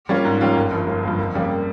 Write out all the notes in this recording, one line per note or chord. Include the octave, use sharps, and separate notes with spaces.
G3 A#3 C#4 F4
G#2
G3 A#3 C#4 F4
G1
G2 F3 A#3
G1
G2 F3 A#3
F2
C#3 G3 A#3